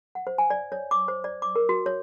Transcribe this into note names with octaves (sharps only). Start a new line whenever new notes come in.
F#5
C5
G#5
D5
C#5
D6
C5
D5
D6
A#4
F#4
C#5